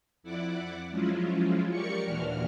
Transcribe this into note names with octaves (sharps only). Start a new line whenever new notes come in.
F2 E4 D5 F#5 D6
F3 F#3 G#3 C#4 E4 F4
G4 A#4 D5 C#6 C#7
D#2 A#2 E3 D4 F#4 F6